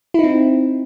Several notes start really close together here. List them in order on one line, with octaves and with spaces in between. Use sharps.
E4 D#4 C4